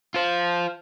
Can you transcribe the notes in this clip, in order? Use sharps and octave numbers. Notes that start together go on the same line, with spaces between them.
F4 C5